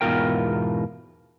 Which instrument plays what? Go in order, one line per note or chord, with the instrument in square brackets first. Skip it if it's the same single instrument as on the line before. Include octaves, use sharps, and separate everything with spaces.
[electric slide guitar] E2 G#2 B2 F4 A#4 G5